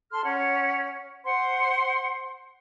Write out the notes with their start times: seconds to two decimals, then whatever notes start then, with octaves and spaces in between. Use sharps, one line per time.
0.11 A4 C6 F6
0.24 C#4 C#5 F#5
1.24 C5 F#5 C6